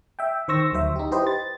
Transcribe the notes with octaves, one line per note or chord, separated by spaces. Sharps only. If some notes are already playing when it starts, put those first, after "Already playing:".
E5 G5
D#3 C5 C#6 E6 A#6
D2 F#3 C5 E5
D#4 G4
E4 G4 B4 C5 D#5
A6